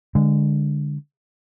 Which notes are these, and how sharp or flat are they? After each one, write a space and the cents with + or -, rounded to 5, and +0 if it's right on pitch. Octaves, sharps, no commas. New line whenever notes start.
D3 +0 G#3 -15